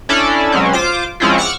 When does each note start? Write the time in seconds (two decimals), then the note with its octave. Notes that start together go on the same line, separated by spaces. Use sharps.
0.09 C#4 D4 E4 A4 D5
0.52 B2 F#3 G#3 C4 C#4
0.73 F4 C5 D6
1.20 F3 G#3 C4 C#4 E4 F4
1.38 F#5 C#6 D6 E6 F6